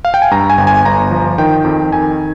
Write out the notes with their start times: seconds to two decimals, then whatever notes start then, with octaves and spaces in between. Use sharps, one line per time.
0.05 F5
0.14 G5
0.22 G#5
0.31 G2 A#5
0.50 G#5
0.58 G1
0.67 G#5
0.85 G1 A#5
1.11 F3
1.38 D#3 G5
1.65 F2
1.93 D#3 G#5